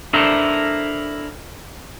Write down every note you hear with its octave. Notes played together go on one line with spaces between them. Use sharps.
D4 E4 A4 A#4 C5 E5